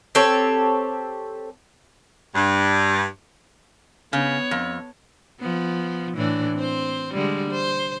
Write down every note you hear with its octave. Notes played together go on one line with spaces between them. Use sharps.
C4 G4 A4 C#5
G2
C#3 B3 C#5
F2
F3 B3
A2 E3 D4
C4 C5
D3 G3 G#3
C5